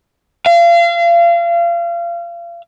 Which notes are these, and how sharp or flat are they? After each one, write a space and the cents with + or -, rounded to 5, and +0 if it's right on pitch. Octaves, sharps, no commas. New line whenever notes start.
F5 -30